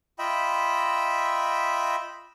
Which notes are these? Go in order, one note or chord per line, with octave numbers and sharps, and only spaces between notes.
F4 D#5 E5 G5 B5